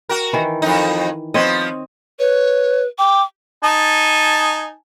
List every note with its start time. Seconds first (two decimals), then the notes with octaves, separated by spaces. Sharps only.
0.09 F#4 A#4
0.33 D#3 E3
0.62 F2 G#2 D#4
1.34 F3 B3 C4 C#5 D#5
2.19 B4 C#5
2.99 G5 D6
3.64 D#4 G#5 A5